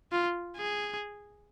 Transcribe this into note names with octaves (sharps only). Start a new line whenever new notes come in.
F4
G#4